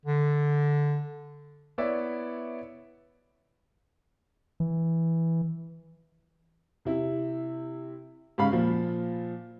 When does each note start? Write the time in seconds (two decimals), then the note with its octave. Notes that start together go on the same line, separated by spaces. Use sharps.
0.06 D3
1.78 B3 E4 C#5 D5 E5
4.60 E3
6.85 C3 E4
8.38 G#2 C#3 F5 B5
8.52 A#2 F3